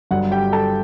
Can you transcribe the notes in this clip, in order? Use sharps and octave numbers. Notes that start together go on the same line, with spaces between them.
G1 G2 F#3 F#5
G4 G5
A4 A5